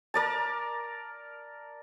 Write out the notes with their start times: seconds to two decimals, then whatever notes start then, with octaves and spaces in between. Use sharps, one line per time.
0.14 A#4 D5 A5